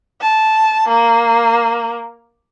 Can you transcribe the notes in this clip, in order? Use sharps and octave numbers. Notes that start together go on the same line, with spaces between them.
A5
A#3